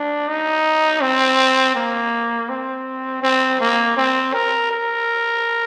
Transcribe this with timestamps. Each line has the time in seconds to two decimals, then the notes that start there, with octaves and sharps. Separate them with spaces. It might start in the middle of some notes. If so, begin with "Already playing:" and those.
Already playing: D4
0.28 D#4
1.02 C4
1.75 A#3
2.49 C4
3.22 C4
3.60 A#3
3.96 C4
4.33 A#4
4.71 A#4